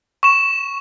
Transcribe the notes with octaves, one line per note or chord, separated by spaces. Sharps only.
C#6 E7